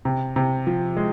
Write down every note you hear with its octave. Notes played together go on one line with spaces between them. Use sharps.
C3
C3
F3
G#3